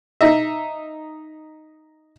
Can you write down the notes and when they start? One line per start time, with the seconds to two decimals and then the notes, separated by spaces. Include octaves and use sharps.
0.21 D#4 D#5 E5